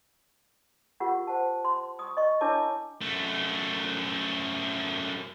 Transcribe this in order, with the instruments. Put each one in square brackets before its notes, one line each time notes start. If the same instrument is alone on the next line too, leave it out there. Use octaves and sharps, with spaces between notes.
[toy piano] F4 G4 A#4 F#5 C#6
C5 F#5 A5
C6
C#6 D#6
D#5 C#6
D4 E4 A#4 C#5 A5 D6
[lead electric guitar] F#2 A3